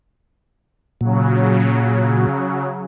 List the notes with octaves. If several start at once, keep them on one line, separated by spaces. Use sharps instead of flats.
A#2 C#3 F#3